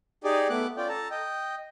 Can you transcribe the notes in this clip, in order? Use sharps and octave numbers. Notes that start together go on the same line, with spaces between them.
D#4 G4 G#4 D5
A3 B3 D6 F#6
C#4 F4 D5 G5
A4 A5 A#5
D#5 G5